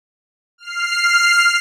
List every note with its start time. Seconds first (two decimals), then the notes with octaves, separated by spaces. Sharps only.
0.58 F6 C7